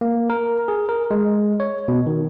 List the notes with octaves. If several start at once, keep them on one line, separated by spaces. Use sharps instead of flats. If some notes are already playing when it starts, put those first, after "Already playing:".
A#3
A#4
G#4
A#4
G#3
C#5
B2
D#3